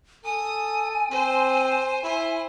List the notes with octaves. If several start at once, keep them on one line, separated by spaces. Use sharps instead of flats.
A4 G#5 D#6
C4 C5
E4 C5